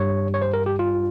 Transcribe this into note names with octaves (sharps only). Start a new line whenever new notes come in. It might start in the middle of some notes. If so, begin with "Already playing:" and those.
Already playing: G2 G3 C#5
C#5
C5
A#4
G4
F4